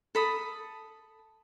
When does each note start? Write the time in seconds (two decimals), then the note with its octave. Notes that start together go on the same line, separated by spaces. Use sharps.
0.15 A4 B5 D#6